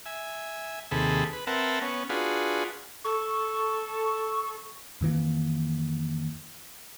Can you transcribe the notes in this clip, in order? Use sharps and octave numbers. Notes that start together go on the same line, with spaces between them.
E5 G#5
D#2 C3 G#4 A4 B5
B4
C4 A#4 B4 E5 F#5 A5
B3 C#4
D4 F4 F#4 G#4 B4
A4 C#6
F2 D#3 E3 A#3